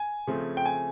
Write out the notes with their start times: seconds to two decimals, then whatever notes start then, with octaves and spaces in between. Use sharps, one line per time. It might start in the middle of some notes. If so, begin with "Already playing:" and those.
Already playing: G#5
0.27 C#3 F3 A3 C4
0.57 G5
0.66 G#5